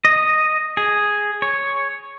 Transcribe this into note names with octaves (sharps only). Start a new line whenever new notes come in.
D#5
G#4
C#5